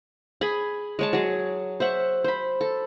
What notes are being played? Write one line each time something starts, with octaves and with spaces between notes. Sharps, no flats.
G#4 G#5 B5
G#3 C#5 A5
F#3 G#4
C5 E5 F#5 C#6
C5 B5
A4